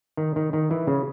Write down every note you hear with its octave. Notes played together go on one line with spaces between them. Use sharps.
D#3
D#3
D#3
E3
C#3